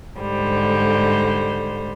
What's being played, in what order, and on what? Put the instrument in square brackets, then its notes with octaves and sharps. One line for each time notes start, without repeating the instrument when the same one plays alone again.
[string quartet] G#2 D3 G3 C5